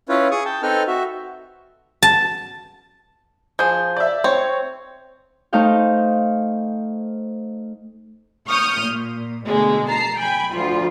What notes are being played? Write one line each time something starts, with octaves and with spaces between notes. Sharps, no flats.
C#4 E4 F4 B4 C#5
G#4 C#6 D#6
G5 A5
C4 D#4 A4 B4 G5 F6
F#4 E5
A5
F3 G#4 G6
D5 E5
C4 C#5
A3 D#4 C5 D#5 F5 G5
C#6 D#6 F6 G6
A#2
B2 D3 G#3 A3
A5 A#5 C7
G5 G#5 B5
D2 F3 F4